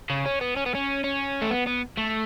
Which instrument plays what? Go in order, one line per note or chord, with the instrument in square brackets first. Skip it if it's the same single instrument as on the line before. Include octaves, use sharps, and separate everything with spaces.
[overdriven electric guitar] C#3
C#4
B3
C#4
B3
C#4
C#4
A3
B3
B3
A3